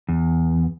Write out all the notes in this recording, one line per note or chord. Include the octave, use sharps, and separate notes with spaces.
E2